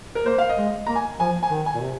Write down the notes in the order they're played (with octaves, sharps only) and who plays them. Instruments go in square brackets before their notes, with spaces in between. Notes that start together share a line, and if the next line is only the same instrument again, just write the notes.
[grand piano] A#4
[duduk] A#3 [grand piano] C5
[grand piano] F5
D#5
[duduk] G#3
[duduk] A#3 [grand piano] A#5
[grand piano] G#5
[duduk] F3 [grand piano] G#5
[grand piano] G#5
[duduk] D#3
[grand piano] G#5
[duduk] A#2
C3